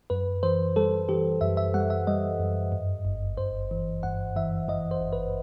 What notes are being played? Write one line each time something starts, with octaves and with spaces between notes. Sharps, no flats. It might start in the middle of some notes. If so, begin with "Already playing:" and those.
F#2 B4
E3 C5
G3 A4
E3 G4
F#2 E5
E5
G3 F#5
E5
G3 D#5
F#2
G2
G1
G1 C5
E3
G2 F#5
E3 E5
E3 D#5
C5
G1
B4